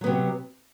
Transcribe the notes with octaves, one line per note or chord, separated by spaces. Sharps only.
C3 F#3 B3